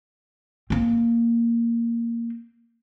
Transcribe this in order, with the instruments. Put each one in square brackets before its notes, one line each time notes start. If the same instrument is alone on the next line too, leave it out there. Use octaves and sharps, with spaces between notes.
[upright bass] A#3 C4